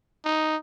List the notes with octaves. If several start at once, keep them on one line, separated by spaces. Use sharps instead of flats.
D#4